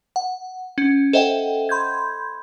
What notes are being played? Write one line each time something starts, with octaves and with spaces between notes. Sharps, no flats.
F#5
C#4
A4 C5 D#5 E5 F#5 G5
B5 C6 G6 G#6